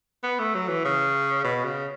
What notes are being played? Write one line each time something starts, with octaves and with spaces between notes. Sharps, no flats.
B3
A3
F#3
E3
C#3
B2
C#3